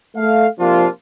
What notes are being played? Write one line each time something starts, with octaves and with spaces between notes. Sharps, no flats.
A3 F5
C3 F3 A#3 D4 F4